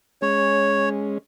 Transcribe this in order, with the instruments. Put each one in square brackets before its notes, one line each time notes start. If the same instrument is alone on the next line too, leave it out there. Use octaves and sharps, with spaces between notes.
[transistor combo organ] G#3 C#4 [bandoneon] C#5